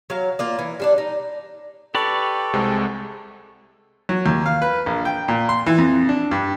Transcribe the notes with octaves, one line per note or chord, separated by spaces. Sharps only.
F#3 F5
A#3 F4 D5
E3
G3 D4 D5
D#4
G4 A4 B4 D5 C#6
C2 C3 G#3
F#3
D#2
F5
B4
A#1
G5
A#2
C6
E3
F2
D4
G2